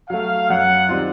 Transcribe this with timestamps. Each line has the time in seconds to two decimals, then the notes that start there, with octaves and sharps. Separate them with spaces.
0.09 F#3 A3 F5
0.49 F#2 F#5
0.89 D#3 G3 C4 F4